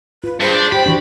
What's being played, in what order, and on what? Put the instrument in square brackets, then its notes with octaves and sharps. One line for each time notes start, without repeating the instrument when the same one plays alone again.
[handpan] F4 [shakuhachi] B4
[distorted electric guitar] G2 [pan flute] G#4 [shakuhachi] C5
[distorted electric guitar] D4
[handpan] G4 [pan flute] G5 [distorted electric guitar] B5
[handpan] E3 D4 [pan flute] F#4